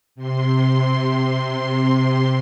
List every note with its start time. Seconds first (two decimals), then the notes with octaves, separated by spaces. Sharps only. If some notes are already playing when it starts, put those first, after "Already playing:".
0.15 C3 C6